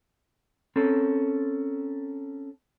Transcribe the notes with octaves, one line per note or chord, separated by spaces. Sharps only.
C4 C#4 A4 A#4